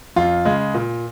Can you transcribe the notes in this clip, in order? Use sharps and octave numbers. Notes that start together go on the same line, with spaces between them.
F2 F4
C#3 G#3
A#2